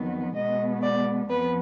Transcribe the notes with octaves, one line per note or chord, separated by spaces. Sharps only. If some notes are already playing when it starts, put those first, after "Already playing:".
Already playing: F2 D#3 F#3 B3
B2 G#3 B3 D#5
D5
F2 F3 B3 B4